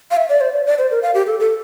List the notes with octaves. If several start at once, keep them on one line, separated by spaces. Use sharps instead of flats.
F5
E5
D5
C5
D5
D5
C5
A#4
F5
G4
A4
A4